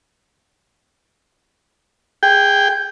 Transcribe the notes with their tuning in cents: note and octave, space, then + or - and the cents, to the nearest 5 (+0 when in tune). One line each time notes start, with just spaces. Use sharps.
G#4 -20 G5 +0